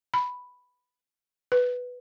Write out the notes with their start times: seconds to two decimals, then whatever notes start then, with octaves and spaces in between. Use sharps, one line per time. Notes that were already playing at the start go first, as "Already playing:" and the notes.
0.14 B5
1.52 B4